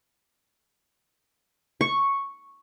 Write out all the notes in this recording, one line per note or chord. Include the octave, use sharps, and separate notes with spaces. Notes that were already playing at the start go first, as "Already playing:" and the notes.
C#6